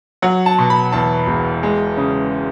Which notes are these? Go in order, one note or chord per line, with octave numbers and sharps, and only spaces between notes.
F#3 F#5
A5
B2
B5
E2 A5
E1
G#3
C#3